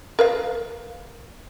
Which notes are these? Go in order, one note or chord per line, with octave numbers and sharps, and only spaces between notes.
A#4 B4 F5